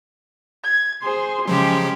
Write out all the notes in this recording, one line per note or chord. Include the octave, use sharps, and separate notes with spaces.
G#6
G#4 C5 C6
C#3 F3 F#3 G#3 C#4 G4